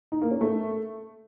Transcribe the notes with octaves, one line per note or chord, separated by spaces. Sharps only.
D#4
A#3
C#4
A3